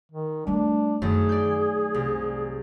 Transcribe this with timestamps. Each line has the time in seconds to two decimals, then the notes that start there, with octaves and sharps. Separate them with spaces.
0.12 D#3
0.47 G3 A3 D4
1.02 F#2 D#3 A3 G#4
1.29 D5 G6
1.94 C2